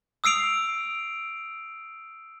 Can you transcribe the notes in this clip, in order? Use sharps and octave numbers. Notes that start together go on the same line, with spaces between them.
D#6 E6 C7 D7 F7